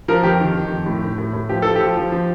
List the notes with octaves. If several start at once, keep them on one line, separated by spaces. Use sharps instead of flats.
F3 A#4
F2 G4
D#3
D#3
F2
A2
A2
A2
A2
F3 G4
F3 A4
G4
F3
F3
F3